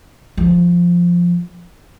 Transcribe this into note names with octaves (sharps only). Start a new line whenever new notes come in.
F3